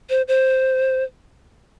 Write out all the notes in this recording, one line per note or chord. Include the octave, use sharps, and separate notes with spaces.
C5
C5